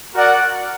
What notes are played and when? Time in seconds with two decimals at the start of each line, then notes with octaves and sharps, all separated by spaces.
0.15 F#4 A#4 D5 F#5